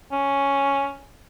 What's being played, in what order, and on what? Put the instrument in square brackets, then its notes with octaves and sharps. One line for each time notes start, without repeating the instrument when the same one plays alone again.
[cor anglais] C#4